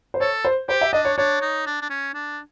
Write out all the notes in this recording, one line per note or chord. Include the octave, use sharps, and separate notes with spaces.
C5
A4 C#5
C5
G4 C5
E5
D4 D#5
C#5
D4 C#5
D#4
D4
D4
C#4
D4